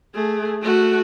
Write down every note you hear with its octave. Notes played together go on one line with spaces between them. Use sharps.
A3 G#4
A3 F#4